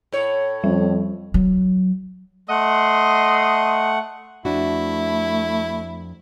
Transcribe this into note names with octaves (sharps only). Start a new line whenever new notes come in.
A2 C#5
F2 G3
F#3
A3 D#5 F#5 C6
F2 A3 D4 E4 F#4